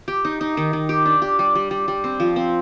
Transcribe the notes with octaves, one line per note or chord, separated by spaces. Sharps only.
G4
D#4
D#4
D#3
D#3
G4
D4
G4
G3
G3
G3
G3
C4
F3
C4